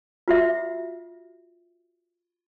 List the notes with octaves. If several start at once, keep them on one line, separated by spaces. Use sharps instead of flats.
F4 F#4 E5